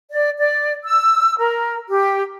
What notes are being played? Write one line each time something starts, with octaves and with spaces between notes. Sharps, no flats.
D5
D5
E6
A#4
G4